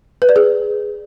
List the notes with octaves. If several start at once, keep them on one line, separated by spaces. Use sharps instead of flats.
B4
D5
G#4